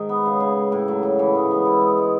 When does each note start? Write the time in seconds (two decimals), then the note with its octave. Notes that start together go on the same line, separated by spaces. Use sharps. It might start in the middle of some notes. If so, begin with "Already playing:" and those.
Already playing: G#2 D#3
0.09 B3
0.26 C#3
0.40 C#3
0.56 A2
0.72 A2
0.88 F#3
1.03 F#3
1.19 E3
1.35 G#2
1.51 B3
1.65 E4
1.81 G#3
1.98 G#3